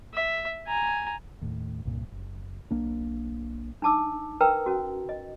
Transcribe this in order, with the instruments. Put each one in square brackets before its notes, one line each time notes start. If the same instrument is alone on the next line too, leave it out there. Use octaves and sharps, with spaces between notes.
[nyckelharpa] E5
G#5 A#5
[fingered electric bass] D#2 A2
C2 G2 A#2
F#1
B1 A#3 D4
[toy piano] D4 D#4 A5 D6 E6
A#4 B4 G5 A#5 E6
C#4 F#4
D#5